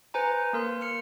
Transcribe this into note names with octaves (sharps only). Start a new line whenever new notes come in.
B4 C5 G#5 A#5
A#3 A#4 C6
F6 C#7